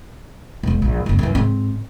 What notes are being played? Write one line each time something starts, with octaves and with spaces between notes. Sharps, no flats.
E1 B1
A#1
F#1 C#2
F#2 E3
G#2 C4